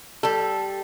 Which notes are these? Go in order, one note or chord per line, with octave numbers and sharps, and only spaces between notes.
G3 A4